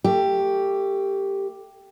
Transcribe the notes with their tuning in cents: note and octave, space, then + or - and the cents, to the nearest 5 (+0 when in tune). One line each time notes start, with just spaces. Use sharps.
A3 +30 G4 +0